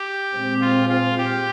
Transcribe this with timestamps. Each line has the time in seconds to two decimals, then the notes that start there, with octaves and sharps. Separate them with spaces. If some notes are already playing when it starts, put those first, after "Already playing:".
Already playing: G4
0.33 A#2 G#3 C4
0.61 F4
0.89 F4
1.18 G4